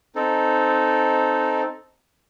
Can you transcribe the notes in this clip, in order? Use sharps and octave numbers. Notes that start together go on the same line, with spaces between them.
C4 D#4 A4